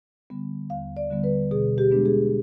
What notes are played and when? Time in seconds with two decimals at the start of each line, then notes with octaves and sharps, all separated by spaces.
0.30 D3 G3 B3
0.70 D#2 F5
0.97 D5
1.10 D3 G3 B3
1.24 B4
1.51 B2 G#4
1.78 G4
1.91 G#3 B3 D4
2.06 G#4